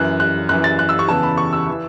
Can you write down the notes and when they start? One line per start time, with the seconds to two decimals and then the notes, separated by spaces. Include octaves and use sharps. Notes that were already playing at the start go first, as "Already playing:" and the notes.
Already playing: F#2 E3 F#6
0.20 F#6
0.49 F#2 E3 F#6
0.64 A6
0.79 F#6
0.89 E6
0.99 C#6
1.08 E2 C#3 E3 A5
1.23 B5
1.38 C#6
1.53 E6
1.69 E3